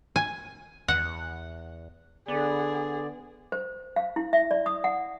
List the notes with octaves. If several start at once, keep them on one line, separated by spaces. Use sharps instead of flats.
G#5
E2 F#5
D3 B3 G#4 D5
C5
F5
E4
E5
D5
D#6
F#5